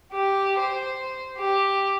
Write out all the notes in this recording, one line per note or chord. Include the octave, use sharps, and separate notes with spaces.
G4
C5
G4